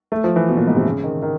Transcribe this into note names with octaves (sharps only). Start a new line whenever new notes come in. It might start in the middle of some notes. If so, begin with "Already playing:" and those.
A3
F3
E3
B2
A#2
G#2
C3
C#3
D#3
D#3